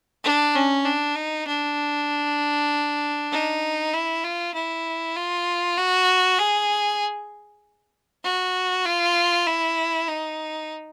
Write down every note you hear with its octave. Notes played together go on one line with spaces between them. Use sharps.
D4
C#4
D4
D#4
D4
D#4
E4
F4
E4
F4
F#4
G#4
F#4
F4
E4
D#4